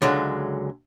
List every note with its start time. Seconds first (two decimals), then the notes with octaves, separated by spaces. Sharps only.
0.02 C#2 D3 F#3 G#3